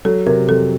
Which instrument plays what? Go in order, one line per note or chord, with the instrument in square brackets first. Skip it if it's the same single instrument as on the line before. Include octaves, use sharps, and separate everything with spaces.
[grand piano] F#3 [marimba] A4
[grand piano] C3 [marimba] A#4
[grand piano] F2 [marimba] A4